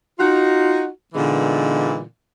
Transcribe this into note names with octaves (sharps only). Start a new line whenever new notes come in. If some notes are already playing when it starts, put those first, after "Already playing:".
D#4 F4 F#4
A#2 D3 E3 G#3 B3 D#4